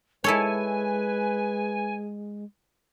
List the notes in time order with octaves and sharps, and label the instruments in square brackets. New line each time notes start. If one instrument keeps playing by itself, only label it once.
[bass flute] G#3 [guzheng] E4 A4 C#5 [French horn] B4 [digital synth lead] G#5